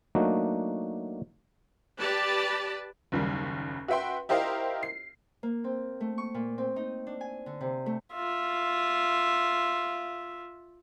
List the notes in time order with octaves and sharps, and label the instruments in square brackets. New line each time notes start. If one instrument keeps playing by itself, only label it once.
[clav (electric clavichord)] F#3 A3 A#3 D4 D#4 F#4
[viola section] G4 B4 D5 A5
[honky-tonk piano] F#1 D#2 G3
F#4 B4 E5 G5 C6
E4 G4 A#4 C5 D#5 F5
C7
[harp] A#3
C4
A3
C#6
A#2
C4
D#4
D4
G#5
D3
C3
A3
[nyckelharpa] F4 E5